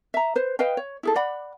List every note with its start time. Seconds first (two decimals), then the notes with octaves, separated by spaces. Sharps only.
0.14 E5 A#5
0.36 B4 C5
0.59 B4 D#5 F5 G5
0.77 C#5
1.03 E4 G#4 A4
1.16 D5 F#5 B5